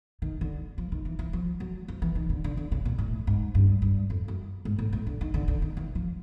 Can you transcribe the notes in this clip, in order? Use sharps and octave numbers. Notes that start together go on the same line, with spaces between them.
D#3
D3
F3
D#3
E3
E3
F3
F#3
F3
E3
D#3
D3
D3
D3
C#3
A#2
A2
G#2
G2
G2
F2
F#2
G#2
A2
A2
D3
D#3
D3
D3
D#3
E3
F3